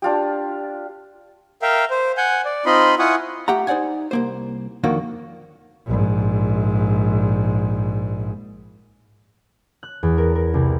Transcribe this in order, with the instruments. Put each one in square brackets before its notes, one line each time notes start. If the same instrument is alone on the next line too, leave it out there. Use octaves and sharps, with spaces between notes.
[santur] D4 F4 G4
[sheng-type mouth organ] A#4 E5 F5 G5
C5
F#5 G#5 G6
D5
C4 D#4 F4 D#5 B5 C6
E4 F4 F#5 G#5 C#6 D#6
[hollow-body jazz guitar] A3 G4 F#5 A#5
D#4 C5 D5 F#5 G#5
C2 A#3 C5
F2 D3 D#3 A#3 F#4
[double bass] A#1 G#2
[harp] F#6
E2
A#4
A#4
C2